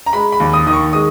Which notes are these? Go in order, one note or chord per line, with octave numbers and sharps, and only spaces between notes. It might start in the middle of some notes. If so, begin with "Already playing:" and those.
A#5
G#3 B5
B5
D#2
D#6
D#3 D#6
C#6
G#3 D#6